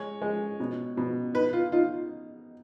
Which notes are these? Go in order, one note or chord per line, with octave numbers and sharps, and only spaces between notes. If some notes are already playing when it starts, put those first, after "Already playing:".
Already playing: G#3 C#5
G#3
B2
B2
D#4 B4
F4
D#4 F4